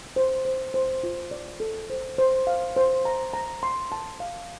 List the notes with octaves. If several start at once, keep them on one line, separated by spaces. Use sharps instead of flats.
C5
C5
C5
F4
D5
A4
C5
C5
F5
C5
A#5
A#5
C6
A5
F5